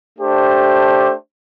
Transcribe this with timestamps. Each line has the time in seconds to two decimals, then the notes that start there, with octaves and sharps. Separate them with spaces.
0.17 A3 D4 G4 C5